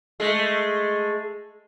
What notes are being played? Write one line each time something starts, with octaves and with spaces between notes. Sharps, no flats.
G#3 A3